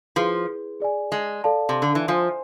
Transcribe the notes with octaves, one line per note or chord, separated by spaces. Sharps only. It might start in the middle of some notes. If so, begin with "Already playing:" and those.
F3 E4 G#4 B4
G#4 D5 G#5
G#3
A4 D5 F5 A5
C3
D3
E3
F3 C5 G#5 C6